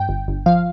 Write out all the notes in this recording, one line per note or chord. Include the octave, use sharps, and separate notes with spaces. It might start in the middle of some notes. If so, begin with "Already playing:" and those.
Already playing: G2 G5
G1
G1
F3 F5